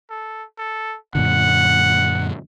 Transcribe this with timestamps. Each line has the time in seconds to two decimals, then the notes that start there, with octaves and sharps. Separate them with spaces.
0.10 A4
0.58 A4
1.15 F#2 A#2 D3 F#5